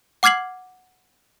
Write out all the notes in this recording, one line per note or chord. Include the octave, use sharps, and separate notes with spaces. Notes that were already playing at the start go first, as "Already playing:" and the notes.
F#5 D6 F6 G#6 C7 F#7